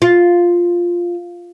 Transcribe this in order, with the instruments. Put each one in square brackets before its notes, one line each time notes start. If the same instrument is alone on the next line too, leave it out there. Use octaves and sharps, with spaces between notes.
[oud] F4